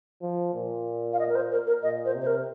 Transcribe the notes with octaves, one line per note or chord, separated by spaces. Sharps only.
F3
A#2
F5
D#5
A#4
C5
A#4
A#4
A#2 D#5
C5
C3
C5
A#4